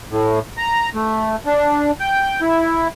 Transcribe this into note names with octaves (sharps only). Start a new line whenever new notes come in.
A2
A#5
A3
D4
G5
E4